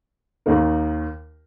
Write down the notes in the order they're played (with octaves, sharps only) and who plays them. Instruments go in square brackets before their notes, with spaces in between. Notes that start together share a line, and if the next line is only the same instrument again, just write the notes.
[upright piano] D#2 D#3 A#3 D#4 A#4